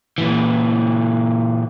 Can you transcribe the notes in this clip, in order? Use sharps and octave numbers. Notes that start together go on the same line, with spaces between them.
A#2 E3